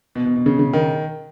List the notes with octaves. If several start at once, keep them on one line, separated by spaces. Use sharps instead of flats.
B2
B2
B2
C#3
C#3
D#3